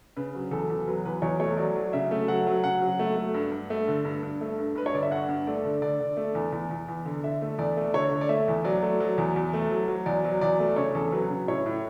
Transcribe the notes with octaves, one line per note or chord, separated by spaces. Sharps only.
C#3 B4
F#3
E2 A4
E2
F#3 B4
E2 B4
E2 C#5
A3 C#5
F#3 D5
F#3
C#3 E5
A3
F#3 F#5
F#3
C#3 F#5
F#3
A3
A3
G2
G2
A3
D3
G2
G2
A3
G2
G2 B4
C#5
D3 D5
E5
G2 F#5
G2
A3 D5
D3
D3 D5
D3
A3
E2
E2
E2
E2
D3
D3 E5
A3
E2 D5
A3
D3 C#5
D3
D5
A3 E5
E2
F#3 D5
A3
F#3
E2
E2
A3
F#3
F#3
E2 D5
F#3
E2 D5
A3
C#3 C#5
E2 A4
F#3 B4
C#3
A2 C#5
A2